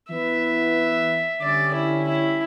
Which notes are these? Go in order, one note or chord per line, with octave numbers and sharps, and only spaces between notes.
E3 B3 E4 B4 E5
D3 G3 C#4 D5
E4
E4